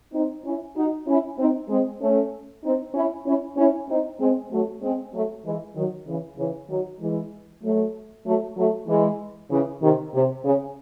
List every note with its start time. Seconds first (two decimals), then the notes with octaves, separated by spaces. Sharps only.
0.13 C4 D#4
0.45 C#4 E4
0.76 D#4 F#4
1.07 C#4 E4
1.39 C4 D#4
1.69 G#3 C4
2.01 A3 C#4
2.63 C4 D#4
2.94 C#4 E4
3.26 C#4 E4
3.57 C#4 E4
3.89 C4 D#4
4.19 G#3 C4
4.51 F#3 A3
4.82 G#3 C4
5.13 F#3 A3
5.45 E3 G#3
5.75 D#3 F#3
6.07 C#3 E3
6.38 C#3 E3
6.69 D#3 F#3
7.00 E3 G#3
7.63 F#3 A3
8.25 F#3 A3
8.56 F#3 A3
8.87 E3 G#3
9.50 C#3 E3
9.81 C3 D#3
10.13 C3
10.44 C#3